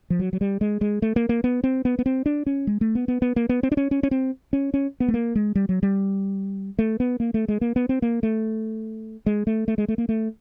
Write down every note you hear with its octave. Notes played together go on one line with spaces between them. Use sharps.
F3
F#3
F#3
G3
G#3
G#3
A3
A#3
A#3
B3
C4
B3
B3
C4
D4
C#4
G#3
A3
B3
B3
B3
A#3
B3
C4
D4
C#4
C#4
C#4
C4
C#4
C#4
B3
A3
A#3
G#3
G3
F#3
G3
A3
B3
A#3
A3
G#3
A#3
B3
C4
A#3
A3
G#3
A3
A3
G#3
A3
A#3
A3